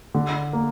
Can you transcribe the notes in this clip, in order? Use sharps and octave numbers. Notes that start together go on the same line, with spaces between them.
D3
A#3